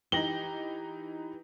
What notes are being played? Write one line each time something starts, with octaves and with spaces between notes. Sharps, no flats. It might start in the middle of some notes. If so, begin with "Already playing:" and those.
E3 D#4 G4 A#6 F#7 G7